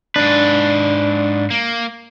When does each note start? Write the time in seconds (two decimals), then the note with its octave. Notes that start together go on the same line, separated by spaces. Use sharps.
0.16 G#2 D4 B4
1.51 A#3